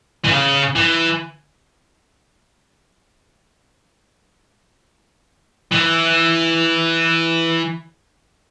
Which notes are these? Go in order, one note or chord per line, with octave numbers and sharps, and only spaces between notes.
E3
C#3
E3
E3